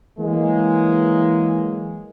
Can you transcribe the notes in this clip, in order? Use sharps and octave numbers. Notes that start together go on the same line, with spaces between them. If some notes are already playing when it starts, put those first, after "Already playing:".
E3 F#3 G#3 A#3